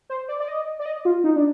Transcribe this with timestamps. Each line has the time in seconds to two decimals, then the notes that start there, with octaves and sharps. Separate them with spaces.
0.10 C5
0.28 D5
0.40 D5
0.48 D#5
0.80 D5
0.86 D#5
1.05 F4
1.24 D#4
1.36 D4